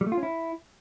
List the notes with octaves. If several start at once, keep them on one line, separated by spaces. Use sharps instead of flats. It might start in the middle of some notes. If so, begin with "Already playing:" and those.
G3
A3
F4
C#4
E4